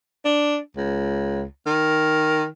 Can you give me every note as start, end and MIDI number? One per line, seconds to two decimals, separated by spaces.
0.25 0.58 62
0.76 1.44 37
1.66 2.46 51